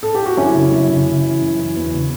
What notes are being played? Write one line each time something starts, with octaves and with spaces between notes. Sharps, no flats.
A4
G4
F#4
F#2 C#4 E4
C#3
F#2
C#3
C#3
E3
F#2
E3
E2
C#3